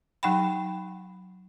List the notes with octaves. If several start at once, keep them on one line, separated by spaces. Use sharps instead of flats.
F#3 D#4 F#5 G5 B5